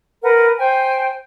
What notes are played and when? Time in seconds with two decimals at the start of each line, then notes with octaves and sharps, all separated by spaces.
0.23 A#4 B4 F#5
0.59 C5 G5 G#5